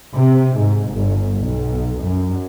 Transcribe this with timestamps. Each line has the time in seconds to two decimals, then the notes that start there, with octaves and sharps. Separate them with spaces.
0.17 C3
0.58 G#2
0.92 G1
1.43 B1
2.04 F#2